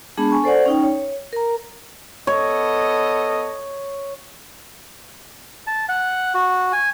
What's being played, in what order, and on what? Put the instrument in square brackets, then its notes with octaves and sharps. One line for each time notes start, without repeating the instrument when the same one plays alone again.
[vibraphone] G#3 B3 D4 G#4 A5 B5
G#5 C#6
A4 C5 D5 F#5
C#4 D#4 G5
C#5
A#4 A#5
[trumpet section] B3 A4 D#5 [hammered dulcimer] C#5
[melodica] A5
F#5
F#4
G#5